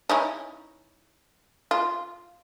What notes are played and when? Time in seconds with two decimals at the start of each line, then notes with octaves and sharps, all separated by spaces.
0.09 C#4 D#4 E4
1.71 F4